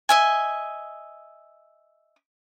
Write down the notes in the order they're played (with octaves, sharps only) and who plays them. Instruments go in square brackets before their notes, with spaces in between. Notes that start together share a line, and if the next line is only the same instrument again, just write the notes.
[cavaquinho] D#5 E5 G#5